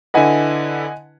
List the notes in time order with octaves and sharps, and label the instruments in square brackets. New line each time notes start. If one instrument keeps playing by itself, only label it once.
[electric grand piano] D3 E4 B4 [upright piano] D#5 F#5 G#5